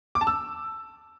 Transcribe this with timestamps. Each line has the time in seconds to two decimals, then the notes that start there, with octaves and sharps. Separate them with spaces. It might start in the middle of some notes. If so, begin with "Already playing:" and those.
0.15 D6
0.21 A5
0.27 E6